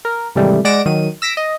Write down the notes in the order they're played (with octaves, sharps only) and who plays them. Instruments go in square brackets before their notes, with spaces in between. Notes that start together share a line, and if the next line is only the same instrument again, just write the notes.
[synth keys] A#4
G#2 C3 D#3 E3 G3 A3
G#3 D5 F#5 A#6 D7 E7
D#3 F#3 D#7
E6 A#6 B6 D7
D#5